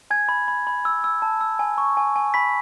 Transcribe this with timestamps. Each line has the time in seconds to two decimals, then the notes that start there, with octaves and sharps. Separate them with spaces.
0.10 G#5 G#6
0.29 B5
0.48 B5
0.67 B5
0.85 E6
1.04 E6
1.22 A5
1.41 E6
1.59 G#5
1.78 C#6
1.97 G#5
2.16 G#5
2.34 B5 B6